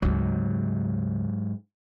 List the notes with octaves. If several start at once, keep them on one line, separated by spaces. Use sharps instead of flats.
D2 G#2 C#3 F#3